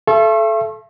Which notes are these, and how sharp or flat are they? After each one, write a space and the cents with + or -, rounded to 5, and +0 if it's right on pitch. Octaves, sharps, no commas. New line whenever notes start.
A4 -20 E5 +40 C#6 -40